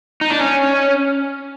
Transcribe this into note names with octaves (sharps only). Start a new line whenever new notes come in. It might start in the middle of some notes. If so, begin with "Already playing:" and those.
D#4
D4
C#4